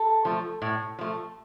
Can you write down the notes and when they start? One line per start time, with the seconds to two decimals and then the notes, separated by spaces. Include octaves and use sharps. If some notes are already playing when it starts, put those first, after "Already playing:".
Already playing: A4
0.25 F3 A3
0.62 A2
0.99 F3 A3